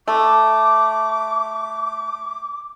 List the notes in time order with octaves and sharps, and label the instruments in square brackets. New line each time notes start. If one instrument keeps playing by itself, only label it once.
[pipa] A3 [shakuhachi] D6